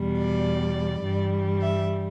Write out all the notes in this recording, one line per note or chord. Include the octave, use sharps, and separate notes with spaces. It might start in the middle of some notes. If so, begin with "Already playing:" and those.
Already playing: E2 B2 G3
D5
G2 E3 G3
E5